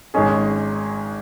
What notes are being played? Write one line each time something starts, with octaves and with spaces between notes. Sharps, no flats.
G#1 G#2 G#3 C#4 G#4